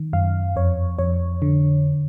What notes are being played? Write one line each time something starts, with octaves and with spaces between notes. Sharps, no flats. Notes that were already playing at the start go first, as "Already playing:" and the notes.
Already playing: D#3
F#2 F5
F2 C#5
F2 C#5
D3